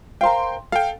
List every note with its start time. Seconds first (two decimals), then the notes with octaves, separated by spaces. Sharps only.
0.21 A#4 C5 F5 G5 C6
0.72 A4 F5 G5